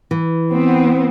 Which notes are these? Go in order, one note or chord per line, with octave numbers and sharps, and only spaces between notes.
E3
B3 C4